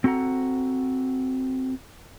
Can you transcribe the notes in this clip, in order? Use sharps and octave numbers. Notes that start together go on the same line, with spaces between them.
C4 F#4 A4 F#5 A#5